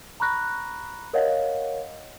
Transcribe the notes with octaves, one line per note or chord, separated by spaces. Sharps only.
A#5 B5 C#6 F#6 A#6
A#4 C#5 D#5 F5 F#5